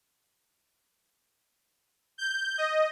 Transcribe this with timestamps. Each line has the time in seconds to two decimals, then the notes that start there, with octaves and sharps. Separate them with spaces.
2.18 G6
2.58 D#5